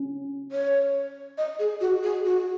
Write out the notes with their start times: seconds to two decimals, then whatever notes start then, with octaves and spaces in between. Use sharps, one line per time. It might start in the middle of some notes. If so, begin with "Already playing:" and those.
Already playing: C#4
0.52 C#5
1.38 D#5
1.59 G#4
1.81 F#4
2.03 G#4
2.25 F#4